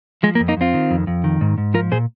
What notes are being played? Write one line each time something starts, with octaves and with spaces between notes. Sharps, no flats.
F3 G#3
A#3
F2
A#3 D#4
F2 C4 F4
D#3
F2
F2
D#3
G#2
G#2
F3 F4 A#4
A#2 G#4 C5